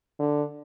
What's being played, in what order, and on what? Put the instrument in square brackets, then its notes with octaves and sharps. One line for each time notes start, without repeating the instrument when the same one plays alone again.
[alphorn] D3